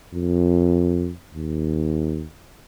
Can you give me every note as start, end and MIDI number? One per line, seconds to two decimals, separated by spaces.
0.14 1.12 41
1.34 2.26 39